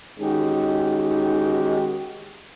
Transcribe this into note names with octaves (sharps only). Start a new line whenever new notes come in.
D#3 G#3 C#4 D#4 F#4 G4